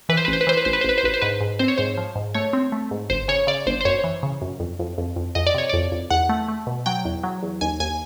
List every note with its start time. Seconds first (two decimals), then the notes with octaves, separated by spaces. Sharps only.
0.09 E3 B4
0.17 C5
0.25 B4
0.28 A1 C5
0.41 B4
0.47 E3 C5
0.57 B4
0.65 A1 C5
0.73 B4
0.81 C5
0.84 A1 B4
0.98 C5
1.03 A1 B4
1.14 C5
1.21 G#2 B4
1.41 G#2
1.59 C4 C5
1.68 C#5
1.78 G#2 C5
1.97 F3
2.15 G#2
2.34 A3 C#5
2.53 C4
2.72 A3
2.91 G#2
3.10 G1 C5
3.28 C#3 C#5
3.47 C#3 D5
3.67 G1 C5
3.81 C5
3.85 F#2 C#5
4.04 E3
4.23 C#3
4.42 F#2
4.60 F2
4.79 F2
4.98 F2
5.16 F2
5.35 F2 D#5
5.47 D5
5.54 C3 C#5
5.69 F2 D5
5.92 F2
6.11 E2 F#5
6.29 A3
6.48 A3
6.67 B2
6.86 F#3 G5
7.05 E2
7.23 F#3
7.43 E2
7.61 D#2 G#5
7.80 D#2 G#5